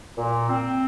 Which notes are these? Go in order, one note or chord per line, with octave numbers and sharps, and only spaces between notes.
A#2
C4